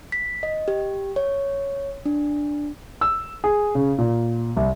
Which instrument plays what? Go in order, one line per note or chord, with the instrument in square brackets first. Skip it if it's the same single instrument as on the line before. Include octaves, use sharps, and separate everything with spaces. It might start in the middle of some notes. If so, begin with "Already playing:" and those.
[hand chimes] B6
D#5
G4
C#5
D4
[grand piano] E6
G#4
C#3
A#2
C2